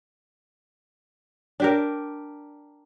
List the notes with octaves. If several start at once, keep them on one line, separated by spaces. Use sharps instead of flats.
D4 G4 A#4